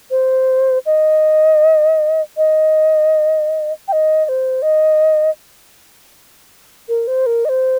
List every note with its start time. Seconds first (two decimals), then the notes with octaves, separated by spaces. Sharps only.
0.11 C5
0.86 D#5
2.37 D#5
3.88 G5
3.92 D#5
4.25 D#5
4.29 C5
4.62 D#5
6.89 A#4
7.07 C5
7.26 A#4
7.45 D#5
7.49 C5